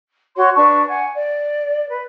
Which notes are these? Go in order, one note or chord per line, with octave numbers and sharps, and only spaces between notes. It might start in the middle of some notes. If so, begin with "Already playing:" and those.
F#4 C#5 C6
D4 B4 A5 C#6
F#5 G#5
D5
B4